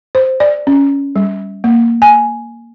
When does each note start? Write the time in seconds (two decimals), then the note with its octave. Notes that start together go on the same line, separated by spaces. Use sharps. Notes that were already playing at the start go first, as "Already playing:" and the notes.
0.15 C5
0.40 D5
0.67 C#4
1.16 G3
1.64 A#3
2.02 G#5